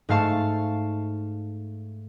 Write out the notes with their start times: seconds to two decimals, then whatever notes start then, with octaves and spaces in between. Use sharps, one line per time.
0.09 G#2 A3 F5 A5 C#6